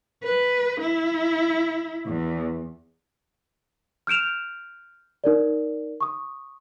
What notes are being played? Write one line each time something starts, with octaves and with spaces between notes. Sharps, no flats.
B4
E4
E2
F6 G6 D7 E7 F7
D#4 A#4 D5
C#6 D#6